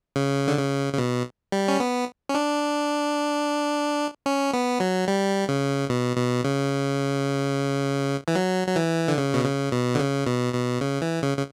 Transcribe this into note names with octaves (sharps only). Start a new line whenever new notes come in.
C#3
D3
C#3
C#3
B2
G3
C#4
B3
C#4
D4
C#4
B3
F#3
G3
C#3
B2
B2
C#3
E3
F#3
F#3
E3
D3
C#3
B2
C#3
B2
D3
C#3
B2
B2
C#3
E3
C#3
C#3